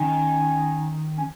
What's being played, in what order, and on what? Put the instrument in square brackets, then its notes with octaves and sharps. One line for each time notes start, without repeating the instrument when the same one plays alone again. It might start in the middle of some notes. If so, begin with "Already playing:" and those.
Already playing: [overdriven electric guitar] D#3 [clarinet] C#4
[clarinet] C#4